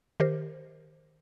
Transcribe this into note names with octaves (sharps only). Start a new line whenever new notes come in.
D#3 G4 A#4 C5